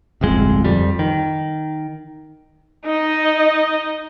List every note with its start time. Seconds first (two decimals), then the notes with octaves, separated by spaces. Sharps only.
0.21 D1 G1 F2 G#3
0.65 F2 G3
0.99 D#3
2.86 D#4 D#5